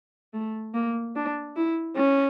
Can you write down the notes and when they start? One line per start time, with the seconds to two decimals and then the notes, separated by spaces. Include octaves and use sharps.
0.34 A3
0.74 A#3
1.16 D4
1.56 E4
1.97 C#4